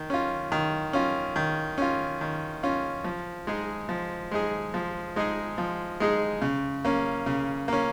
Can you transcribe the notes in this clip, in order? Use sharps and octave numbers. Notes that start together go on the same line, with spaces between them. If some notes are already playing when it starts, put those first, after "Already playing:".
Already playing: D#3
C#4 F4
D#3
C#4 F4
D#3
C#4 F4
D#3
C#4 F4
F3
G#3 D#4 G#4
F3
G#3 D#4 G#4
F3
G#3 D#4 G#4
F3
G#3 D#4 G#4
C#3
A#3 C#4
C#3
A#3 C#4